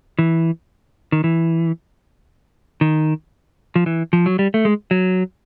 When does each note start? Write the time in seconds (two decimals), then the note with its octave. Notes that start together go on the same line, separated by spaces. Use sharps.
0.19 E3
1.12 D#3
1.24 E3
2.81 D#3
3.76 F3
3.86 E3
4.13 F3
4.26 F#3
4.39 G3
4.54 A3
4.65 G#3
4.91 F#3